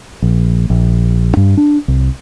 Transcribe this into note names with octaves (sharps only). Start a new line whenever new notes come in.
A#1
A#1
G2
D4
C2